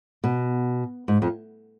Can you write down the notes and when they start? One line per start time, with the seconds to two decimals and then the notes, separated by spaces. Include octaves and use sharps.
0.24 B2
1.08 G#2
1.22 F2